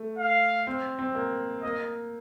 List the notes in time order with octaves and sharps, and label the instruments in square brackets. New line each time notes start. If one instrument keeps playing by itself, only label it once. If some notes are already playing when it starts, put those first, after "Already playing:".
Already playing: [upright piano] A3
[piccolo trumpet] F5
[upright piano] C4
C4
A#3
[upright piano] A#3 [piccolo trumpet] D#5